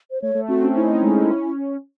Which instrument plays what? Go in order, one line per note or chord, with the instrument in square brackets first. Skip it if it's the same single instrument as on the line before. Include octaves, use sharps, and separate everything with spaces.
[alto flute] C5
[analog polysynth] A3 [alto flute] C#5
[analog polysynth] A3
[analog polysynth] C4 [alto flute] F#4
[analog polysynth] C#4
[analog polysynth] D#4 [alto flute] E4
[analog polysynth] C#4
G#3
C#4